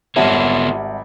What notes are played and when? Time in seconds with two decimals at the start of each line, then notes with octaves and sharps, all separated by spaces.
0.16 G#1 G3 B3 F4 C#5 E5 F#5 A5